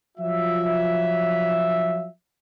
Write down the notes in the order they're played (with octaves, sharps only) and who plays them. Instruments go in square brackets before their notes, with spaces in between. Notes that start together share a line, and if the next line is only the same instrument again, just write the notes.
[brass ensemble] F3 F#3 F4 E5